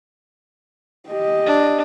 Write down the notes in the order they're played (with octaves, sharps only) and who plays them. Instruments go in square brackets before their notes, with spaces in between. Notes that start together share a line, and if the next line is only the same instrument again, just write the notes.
[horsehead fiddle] G4 D#5
[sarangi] D4